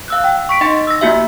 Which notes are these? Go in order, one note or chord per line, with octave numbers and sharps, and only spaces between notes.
F5 E6 F#6
G5
C#6 B6 D7
D#4 D#5 F#5 C6 C#6 A6
E6 A#6
A#3 E4 F#4 G4 E5